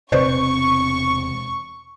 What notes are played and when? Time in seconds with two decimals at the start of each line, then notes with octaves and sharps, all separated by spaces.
0.12 E1 C3 C4 B4 C5 D5 C#6